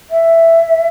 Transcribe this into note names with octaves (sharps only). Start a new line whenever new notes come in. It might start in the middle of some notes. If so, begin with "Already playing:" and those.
E5